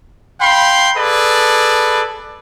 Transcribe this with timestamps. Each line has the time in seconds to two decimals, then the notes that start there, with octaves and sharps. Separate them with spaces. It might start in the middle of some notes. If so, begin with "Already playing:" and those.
0.41 F5 G5 B5 C6
0.97 G#4 A4 B4 D5